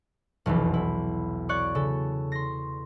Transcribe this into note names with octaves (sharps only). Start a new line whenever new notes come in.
F1 B1 E2 E3
E4
C#5 D5 C#6 F#6
C#3 A4
C6 A#6